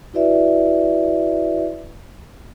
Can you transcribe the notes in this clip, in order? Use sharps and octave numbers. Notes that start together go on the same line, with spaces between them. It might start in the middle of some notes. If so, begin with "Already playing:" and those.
E4 F#4 B4 D5 E5